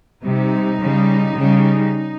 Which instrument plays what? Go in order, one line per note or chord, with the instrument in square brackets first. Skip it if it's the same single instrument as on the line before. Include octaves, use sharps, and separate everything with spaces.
[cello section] C3 G3 D#4
C#3 G3
C#3 G3